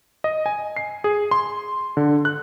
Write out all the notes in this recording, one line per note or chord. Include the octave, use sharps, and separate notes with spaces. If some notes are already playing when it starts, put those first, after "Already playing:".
D#5
G#5
C7
G#4
C6
D3
F#6